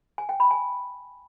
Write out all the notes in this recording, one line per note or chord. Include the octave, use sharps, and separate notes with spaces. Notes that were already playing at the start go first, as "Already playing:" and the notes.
G#5
G5
B5
G#5